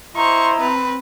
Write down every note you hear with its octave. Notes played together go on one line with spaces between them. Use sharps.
E4 C5 D#5 A#5 C#6
C4 B4